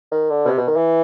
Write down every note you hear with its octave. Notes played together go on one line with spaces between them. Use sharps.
D#3
D3
B2
C3
B2
D#3
E3